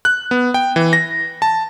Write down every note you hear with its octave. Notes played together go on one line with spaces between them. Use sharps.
F#6
B3
G5
E3
A#6
A5